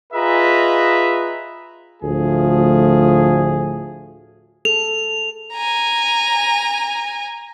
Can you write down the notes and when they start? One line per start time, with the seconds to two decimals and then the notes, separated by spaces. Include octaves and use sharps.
0.13 F4 G#4 B4 D#5 E5 A#5
2.03 D2 A2 F3 A3 G#4
4.65 G#4 A4 F7
5.54 G#5 A#5